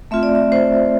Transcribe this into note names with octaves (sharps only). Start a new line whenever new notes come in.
A3 C4 F4 E5
D5
E5
C5